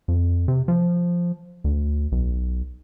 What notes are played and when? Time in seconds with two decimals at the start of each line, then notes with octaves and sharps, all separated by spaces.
0.08 F2
0.48 C3
0.68 F3
1.64 D2
2.12 B1